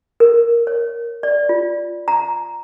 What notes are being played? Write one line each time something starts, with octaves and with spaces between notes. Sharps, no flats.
A#4
C#5
D5
F4
A#5